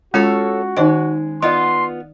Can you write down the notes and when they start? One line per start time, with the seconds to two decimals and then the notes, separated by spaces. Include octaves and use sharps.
0.14 G#3 C#4 F4 F#4 A4 C#5 F5
0.77 D#3 G#3 C#4 D#4 C5 D#5
1.42 B3 F4 D5 D#5 C6 D#6